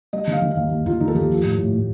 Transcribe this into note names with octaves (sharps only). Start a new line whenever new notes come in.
G3 D#5
D#3 F5
D#3
F5
D#2
D#2
D#2 F4
D#2 D#4
A4
D#3 G4
F3
A2
A2
A2